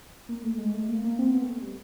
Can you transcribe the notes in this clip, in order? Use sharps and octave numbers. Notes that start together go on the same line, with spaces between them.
A#3
A3
G#3
A3
A#3
A#3
C4
B3
A3
G#3
G3